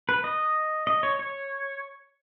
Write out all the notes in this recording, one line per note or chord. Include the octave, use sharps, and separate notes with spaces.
B4
D#5
D#5
C#5
C#5